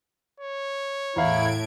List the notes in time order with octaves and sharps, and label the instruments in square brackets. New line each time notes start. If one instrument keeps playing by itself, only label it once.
[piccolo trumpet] C#5
[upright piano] E2 F5 [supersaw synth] A2 G#6 D7 [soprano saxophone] E4